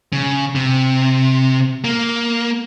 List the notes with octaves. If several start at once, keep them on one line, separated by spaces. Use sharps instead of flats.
C#3
C3
A#3